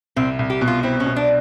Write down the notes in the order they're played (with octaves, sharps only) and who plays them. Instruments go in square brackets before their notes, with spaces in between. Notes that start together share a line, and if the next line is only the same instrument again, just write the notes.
[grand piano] C2 [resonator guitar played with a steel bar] C4
[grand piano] C2
[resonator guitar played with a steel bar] G4
[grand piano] B2
[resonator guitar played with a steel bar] F4
[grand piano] C4 [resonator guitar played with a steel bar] E4
[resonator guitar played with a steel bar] C#4
[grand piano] B2
[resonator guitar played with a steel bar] D4